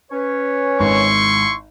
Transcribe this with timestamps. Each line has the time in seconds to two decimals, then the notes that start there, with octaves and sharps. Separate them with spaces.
0.12 C#4 B4 C#5
0.80 G#1 E4 C6 C#6